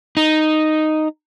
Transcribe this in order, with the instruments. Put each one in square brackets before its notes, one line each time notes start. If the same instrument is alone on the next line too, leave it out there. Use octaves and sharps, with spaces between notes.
[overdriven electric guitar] D#4